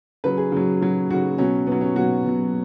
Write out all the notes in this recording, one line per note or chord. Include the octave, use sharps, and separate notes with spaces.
C#3 F#3 B4
G#4
C#3 F#3
C#3 F#3
C#3 F#3 F#4
B2 F#3 C#4
B2 F#3 B3
C#4
B2 F#3 F#4
B2 F#3